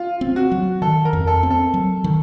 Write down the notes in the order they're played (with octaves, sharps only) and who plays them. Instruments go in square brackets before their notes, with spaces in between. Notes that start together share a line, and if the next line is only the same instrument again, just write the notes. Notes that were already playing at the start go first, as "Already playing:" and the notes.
Already playing: [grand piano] F4
[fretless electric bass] C4
[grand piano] F#4
[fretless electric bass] F#3
[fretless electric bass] D#3 [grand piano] A4
[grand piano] A#4
[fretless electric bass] F2
[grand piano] A4
[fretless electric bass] C4
[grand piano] A4
[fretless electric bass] F#3
D#3